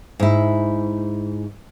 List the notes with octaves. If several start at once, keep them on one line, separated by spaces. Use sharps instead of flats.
G#2 E4